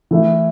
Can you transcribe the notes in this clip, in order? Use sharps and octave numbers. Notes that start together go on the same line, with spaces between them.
E3 A3 E4 A4